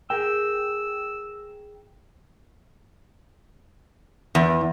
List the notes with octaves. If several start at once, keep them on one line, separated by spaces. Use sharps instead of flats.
G#4 A#4 G5 E6
E2